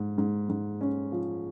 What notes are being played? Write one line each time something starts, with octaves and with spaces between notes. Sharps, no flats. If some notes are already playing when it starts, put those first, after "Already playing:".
Already playing: G#2
G#2
G#2
C#4
F3